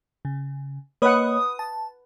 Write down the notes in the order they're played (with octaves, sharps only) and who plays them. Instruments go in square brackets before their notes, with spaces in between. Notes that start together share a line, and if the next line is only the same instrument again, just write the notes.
[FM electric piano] C#3
[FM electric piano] A#3 C#5 D#5 [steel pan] B4 F#5 [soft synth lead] D#6
[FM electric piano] A5